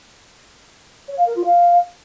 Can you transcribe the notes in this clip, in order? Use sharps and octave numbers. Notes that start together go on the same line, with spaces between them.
C#5
F5
A#4
F4
F5